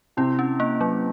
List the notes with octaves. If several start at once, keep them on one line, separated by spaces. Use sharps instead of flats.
C3 C4 E4
C#4
A#3
F#3